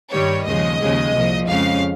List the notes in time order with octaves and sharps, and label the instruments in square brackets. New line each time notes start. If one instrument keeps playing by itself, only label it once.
[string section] G2 D#3 G3 C#5
D#2 C#3 F3 G#3 D#5
D#2 C#3 F3 G#3
C2 A#2 F3
F2 C#3 G#3 F5